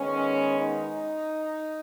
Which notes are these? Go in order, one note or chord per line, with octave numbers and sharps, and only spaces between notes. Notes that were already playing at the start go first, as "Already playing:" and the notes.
Already playing: D#3 G#3 B3 C#4
D#4